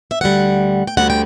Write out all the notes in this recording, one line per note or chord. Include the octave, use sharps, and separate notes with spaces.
E5
D2 D3 G3 F#5
G5
D2 D3 G3 F#5
G5